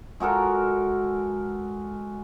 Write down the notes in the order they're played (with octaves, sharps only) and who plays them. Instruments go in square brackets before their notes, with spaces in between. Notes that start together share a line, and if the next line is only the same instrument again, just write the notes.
[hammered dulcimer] G#3 F#4 A4 A#4